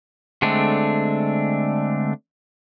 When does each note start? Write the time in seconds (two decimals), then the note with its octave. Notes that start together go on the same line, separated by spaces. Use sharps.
0.42 D3 G#3 A3 C4 D4